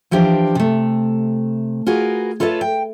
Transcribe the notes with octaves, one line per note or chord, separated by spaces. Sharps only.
E3 F3 D4 G4 A#4 C5
C3 A3
F4 F#4 G#4 A#4 B4
F4 A4 B4 C#5 D#5 E5
G5